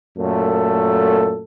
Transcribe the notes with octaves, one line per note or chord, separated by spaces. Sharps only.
F#2 A#2 A3 A4